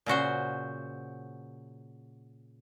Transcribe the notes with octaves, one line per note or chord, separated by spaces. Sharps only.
A#2 C#3 F#4 C5